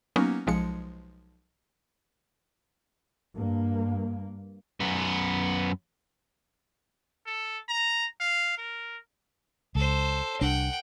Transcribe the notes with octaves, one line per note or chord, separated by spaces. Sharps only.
F#3 A#3 B3 C#4 D#4 F#4
B1 F3 G#3 C#7
G2 A#3
F#2 B3
A4
A#5
F5
A#4
C#2 A4 C5
C2 D4 F#5 G5